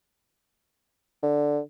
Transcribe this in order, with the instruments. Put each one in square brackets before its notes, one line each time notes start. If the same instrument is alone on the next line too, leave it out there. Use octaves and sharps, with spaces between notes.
[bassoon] D3